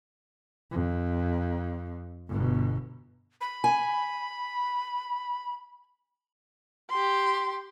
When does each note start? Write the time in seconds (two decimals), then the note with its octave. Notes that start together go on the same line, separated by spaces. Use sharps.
0.71 F2
2.30 G1 B2
3.41 B5
3.64 G#5
6.90 G4 C6